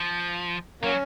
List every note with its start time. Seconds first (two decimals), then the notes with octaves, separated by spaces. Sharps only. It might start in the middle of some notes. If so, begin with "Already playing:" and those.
Already playing: F3
0.82 F#3 A#3 C#4